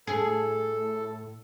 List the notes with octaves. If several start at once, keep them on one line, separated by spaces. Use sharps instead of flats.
A2 G#4 A4